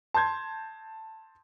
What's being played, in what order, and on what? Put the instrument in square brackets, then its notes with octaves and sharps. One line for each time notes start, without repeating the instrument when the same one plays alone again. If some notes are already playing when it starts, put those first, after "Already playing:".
[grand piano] A5 C6 G6 G#6